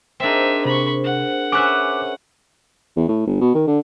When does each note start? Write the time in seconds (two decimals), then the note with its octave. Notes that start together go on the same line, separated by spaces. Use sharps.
0.20 C4 D4 D#4 G#4 A#4 C5 E5
0.65 C3 B5 C#6
1.04 F#5
1.52 C#4 B4 E5 D6 F#6
2.96 E2
3.08 A2
3.27 G1
3.41 B2
3.55 D#3
3.67 D3